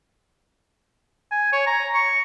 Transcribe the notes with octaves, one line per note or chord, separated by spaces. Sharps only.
G#5
C#5
A#5
C#6